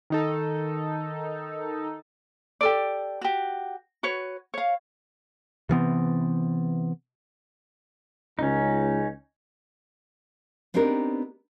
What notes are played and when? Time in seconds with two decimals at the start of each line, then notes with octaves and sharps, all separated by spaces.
0.10 D#3 D#4 A4
2.61 G4 A4 D5
3.21 F#4 G4
4.03 F#4 B4 C#5
4.54 C#5 F5
5.69 C3 E3 B3 C4
8.39 C#2 C#4 D#4
10.74 B3 C4 D4 D#4 G4 A#4